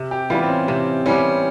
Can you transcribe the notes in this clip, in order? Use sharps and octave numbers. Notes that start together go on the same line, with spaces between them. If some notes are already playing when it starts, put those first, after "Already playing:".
Already playing: C3
G4
E3 G3 B3 F4
C4
C#4
C3 C4
E3 G3 B3 C#4